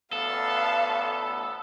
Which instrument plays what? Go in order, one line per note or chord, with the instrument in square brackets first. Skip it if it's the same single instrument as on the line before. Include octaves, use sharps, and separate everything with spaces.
[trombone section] A1 D2 B3 [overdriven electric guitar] A4 [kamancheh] F5 A5